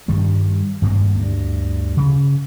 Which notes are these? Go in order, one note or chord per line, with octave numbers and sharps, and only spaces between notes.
G2 D#3 G3
G#1 G2 A#3 C4
D2 G2
C#3